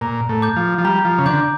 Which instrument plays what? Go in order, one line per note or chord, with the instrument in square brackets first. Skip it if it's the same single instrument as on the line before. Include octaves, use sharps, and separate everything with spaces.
[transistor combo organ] A#2 [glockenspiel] A#5
[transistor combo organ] A2
[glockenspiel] D6 G6
[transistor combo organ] F3
F3
[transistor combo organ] G3 [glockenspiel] A#5
[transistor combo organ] F3
C#3
[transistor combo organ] D3 [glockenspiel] D6 G6